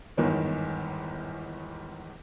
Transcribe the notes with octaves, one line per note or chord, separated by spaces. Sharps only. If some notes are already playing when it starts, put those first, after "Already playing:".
G1 E2 G#2 D#3 C#5